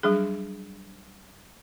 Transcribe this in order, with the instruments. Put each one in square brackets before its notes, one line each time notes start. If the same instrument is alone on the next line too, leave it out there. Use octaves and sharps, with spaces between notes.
[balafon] F#3 G3 D4 G#4